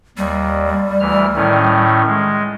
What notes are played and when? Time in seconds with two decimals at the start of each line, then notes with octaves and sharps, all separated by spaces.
0.17 D#2 G3
1.00 D2 E3 F6
1.36 A2 D#3 C#4
2.06 G#3